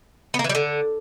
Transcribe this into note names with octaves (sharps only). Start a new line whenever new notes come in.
B3
A#3
E3
G3
D3